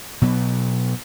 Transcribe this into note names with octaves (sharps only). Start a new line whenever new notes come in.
B2 F#3 B3